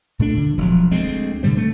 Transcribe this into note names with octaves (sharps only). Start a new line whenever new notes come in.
A#2 A3 D4
A#2 D3
E1 F3 F#3
D2 G#3 C4
B2 D3 G3 C4
A3